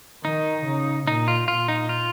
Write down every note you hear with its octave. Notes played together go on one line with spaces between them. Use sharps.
D#3 D#4
C#3
A#2 D#4
F4
A#2 F4
D#4
F4